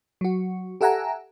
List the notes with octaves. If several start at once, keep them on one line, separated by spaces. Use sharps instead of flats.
F#3 F#4
G4 A4 E5 F#5 G#5 A#5